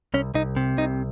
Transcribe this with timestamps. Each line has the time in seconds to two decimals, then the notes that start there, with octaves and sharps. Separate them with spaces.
0.14 C2 C#4
0.34 C2 D#4
0.56 C3
0.77 C2 D#4